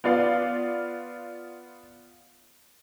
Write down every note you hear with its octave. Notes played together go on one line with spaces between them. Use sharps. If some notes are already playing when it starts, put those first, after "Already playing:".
B3 F4 D5 F5